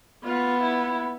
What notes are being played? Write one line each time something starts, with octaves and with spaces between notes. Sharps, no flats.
B3 F4
E4